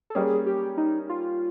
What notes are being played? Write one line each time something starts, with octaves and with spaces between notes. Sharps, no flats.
A4
G3 A#3 C#4 G#4
G4
D#4
F4